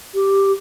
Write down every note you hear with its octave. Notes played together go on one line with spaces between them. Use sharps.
G4